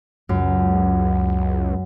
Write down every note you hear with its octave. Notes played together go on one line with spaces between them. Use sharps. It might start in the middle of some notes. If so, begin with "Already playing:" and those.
C#2 F#2